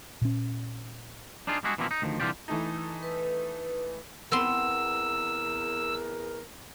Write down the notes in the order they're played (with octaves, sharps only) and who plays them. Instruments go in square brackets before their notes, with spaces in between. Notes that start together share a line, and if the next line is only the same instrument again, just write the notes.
[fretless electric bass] A#2 C#4
[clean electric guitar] D4 D#4 F4 G#4 D5
G3 G#3 D4 E4 F#4 G#4
B2 E3 F3 A#3 C4 E4
D#4
D2 D#3 F3
C2 D3 E3 F4 G4 D5
[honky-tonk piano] E3 A3 D#4
[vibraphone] B4
[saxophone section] E2 A#4 [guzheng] B3 C4 C6 [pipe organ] E6